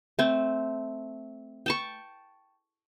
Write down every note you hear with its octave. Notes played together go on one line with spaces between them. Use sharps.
A3 C4
G5 A5 C#6